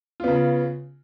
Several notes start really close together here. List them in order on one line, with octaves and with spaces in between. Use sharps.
F4 B3 C#3